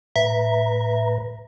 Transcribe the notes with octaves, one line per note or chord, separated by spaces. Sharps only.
A2 B4 E5 A#5